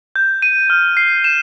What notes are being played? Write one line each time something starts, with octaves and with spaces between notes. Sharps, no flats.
G6
D#7
F6
C7
E7